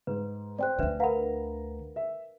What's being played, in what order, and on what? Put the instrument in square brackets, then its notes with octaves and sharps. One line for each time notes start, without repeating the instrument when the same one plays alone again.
[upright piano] G#2 [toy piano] B4
[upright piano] C4 C5 [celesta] D5 G5 F#6
[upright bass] D2 D3 [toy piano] D4 B4 E5
[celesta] A#4 B4 [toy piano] F5 F#5 B5 [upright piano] A#5
[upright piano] E5